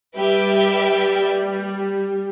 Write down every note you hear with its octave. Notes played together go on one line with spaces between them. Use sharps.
G3 G4 B4 E5 G5